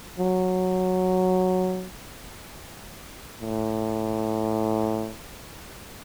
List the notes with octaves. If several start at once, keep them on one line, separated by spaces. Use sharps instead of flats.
F#3
A2